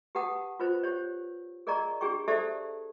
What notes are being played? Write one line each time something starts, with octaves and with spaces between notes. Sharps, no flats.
G4 B4 F#5 A5 D#6
F4 B4 C5
G4 C5 C#5
G#4 A#4 D5 D#5 A#5 C#6
D4 G4 G#4 G5 C#6
G4 A4 C5 D5 E5 A5